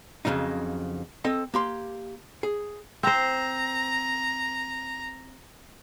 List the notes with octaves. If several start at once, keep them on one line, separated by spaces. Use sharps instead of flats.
F2 A2 C#3 F#3 D#4
C4 A4 D#5
A#3 G4 C6
G#4
C4 C5 A#5